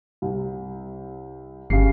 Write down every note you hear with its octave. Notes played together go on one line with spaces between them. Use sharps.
C2
G1 C#3 G4 C7